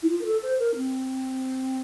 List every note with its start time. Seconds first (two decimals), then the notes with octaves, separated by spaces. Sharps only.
0.02 E4
0.09 F4
0.21 A#4
0.25 A4
0.43 C5
0.59 A#4
0.76 C4